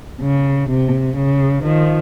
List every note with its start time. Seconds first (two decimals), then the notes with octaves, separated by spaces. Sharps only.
0.21 C#3
0.68 C3
1.16 C#3
1.63 D#3 F3